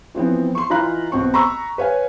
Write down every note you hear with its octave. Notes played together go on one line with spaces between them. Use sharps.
E3 F3 B3 C4
C6 C#6
E3 D#4 F4 A#5 B5 F#6
B1 C4 C#6
A#5 B5 C#6 E6
B4 C#5 F5 G#5